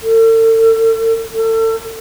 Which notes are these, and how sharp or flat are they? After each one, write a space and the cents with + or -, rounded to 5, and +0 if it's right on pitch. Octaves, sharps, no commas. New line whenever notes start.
A4 +40
A4 +35